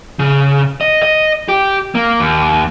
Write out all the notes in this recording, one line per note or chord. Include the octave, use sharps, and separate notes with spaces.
C#3
D#5
D#5
G4
A#3
D#2